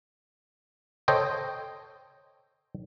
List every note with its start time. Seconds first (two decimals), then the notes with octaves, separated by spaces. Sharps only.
1.08 A4 C5 C#5 D#5 G5